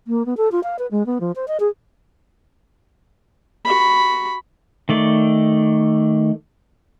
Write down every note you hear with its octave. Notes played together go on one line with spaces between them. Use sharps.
A#3
B3
A4
F4
F5
B4
G#3
B3
F3
C5
D#5
G#4
F#4 B5
D#3 A3 D5